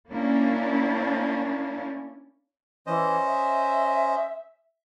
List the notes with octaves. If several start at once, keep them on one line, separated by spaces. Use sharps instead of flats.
A#3 C#4 D4 E4
E3 C#4 C5 D#5
E5